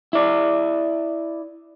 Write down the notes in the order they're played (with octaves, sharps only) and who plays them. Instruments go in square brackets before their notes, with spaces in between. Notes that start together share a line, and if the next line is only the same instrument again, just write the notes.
[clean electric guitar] E4 D5